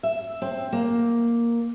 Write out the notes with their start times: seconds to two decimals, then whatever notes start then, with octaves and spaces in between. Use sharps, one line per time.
0.03 E5
0.42 C4
0.73 A#3